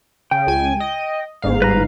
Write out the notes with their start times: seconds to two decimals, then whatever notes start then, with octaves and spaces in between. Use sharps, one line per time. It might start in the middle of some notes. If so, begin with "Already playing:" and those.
0.31 C#3 G5
0.47 C#2 G#5
0.80 D#5
1.42 G1 G#2 F5
1.62 B4 A#5